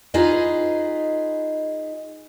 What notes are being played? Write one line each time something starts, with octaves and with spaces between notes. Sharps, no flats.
D#4 F4 G#4 B4 D#5